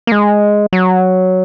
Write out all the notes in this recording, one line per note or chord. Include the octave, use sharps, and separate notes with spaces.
A#3
G#3
F#3